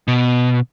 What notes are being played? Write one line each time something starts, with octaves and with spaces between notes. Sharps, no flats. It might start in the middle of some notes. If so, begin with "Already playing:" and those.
B2